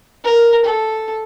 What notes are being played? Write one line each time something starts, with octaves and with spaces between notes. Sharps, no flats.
A#4
A4